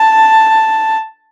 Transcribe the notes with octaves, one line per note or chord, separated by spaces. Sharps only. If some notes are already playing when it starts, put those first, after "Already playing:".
Already playing: A5